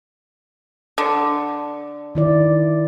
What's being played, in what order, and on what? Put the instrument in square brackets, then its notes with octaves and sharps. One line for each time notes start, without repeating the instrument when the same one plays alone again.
[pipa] D3
[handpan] D#3 E4 D5